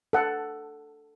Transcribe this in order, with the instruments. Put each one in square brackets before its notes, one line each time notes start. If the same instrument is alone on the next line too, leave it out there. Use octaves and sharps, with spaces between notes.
[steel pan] A4 F#5